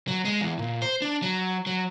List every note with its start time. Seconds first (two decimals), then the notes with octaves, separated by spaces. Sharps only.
0.08 F#3
0.25 G#3
0.41 E2
0.59 A#2
0.82 C5
1.02 D4
1.22 F#3
1.66 F#3